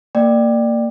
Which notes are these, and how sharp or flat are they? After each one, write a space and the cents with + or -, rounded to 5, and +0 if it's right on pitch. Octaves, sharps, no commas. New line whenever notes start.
A#3 -20 D5 +20 G5 +0